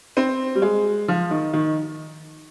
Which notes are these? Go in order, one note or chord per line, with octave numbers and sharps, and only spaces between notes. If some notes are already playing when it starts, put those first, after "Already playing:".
C4
G3
G#3
F3
D#3
D#3